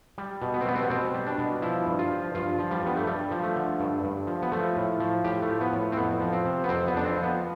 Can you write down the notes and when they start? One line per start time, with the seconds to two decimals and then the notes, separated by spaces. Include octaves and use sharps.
0.18 G3
0.42 B2
0.54 B3
0.61 C4
0.66 G3 B3
0.75 C4
0.82 B3
0.90 B2 C4
1.14 G3
1.26 D4
1.38 B2
1.62 F3 E4
1.87 G2
1.99 F4
2.11 F3
2.35 G2 F4
2.59 F3
2.71 G3
2.83 G2 B3
2.97 A3
3.07 G2 G3
3.31 F3
3.43 A3
3.56 D3
3.80 G2
4.04 G2
4.27 F3
4.42 B3
4.52 F3 A3
4.76 A2
5.00 F3
5.24 A2 G4
5.42 A3
5.49 F3
5.61 B3
5.73 A2
5.92 C4
5.97 F2 B3
6.21 F3
6.33 C4
6.45 C3
6.64 B3
6.69 F2 C4
6.88 B3
6.94 F2 D4
7.05 C4
7.17 F3
7.23 B3